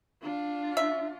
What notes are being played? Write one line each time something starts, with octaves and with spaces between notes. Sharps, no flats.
D4 F4
E5